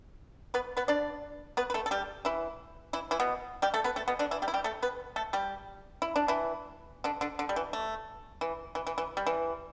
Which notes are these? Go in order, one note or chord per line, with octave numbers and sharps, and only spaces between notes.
B3 B4
B3 B4
D4 D5
B3 B4
B4
A3 A4
A4
G3 G4
E3 E4
E3 E4
E3 E4
B2 B3
G3 G4
A3 A4
B3 B4
A3 A4
B2 B3
D3 D4
E3 E4
G3 G4
E4
G3 G4
A3 A4
B3 B4
A3 A4
G3 G4
E4
D4
E3 E4
D3 D4
D3 D4
D3
G3
E3
A3
E3
E3
E3
E3
G3
E3